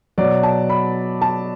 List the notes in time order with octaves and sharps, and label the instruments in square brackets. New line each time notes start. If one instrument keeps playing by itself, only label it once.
[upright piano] B2 F#3 D5
A5
B5
A5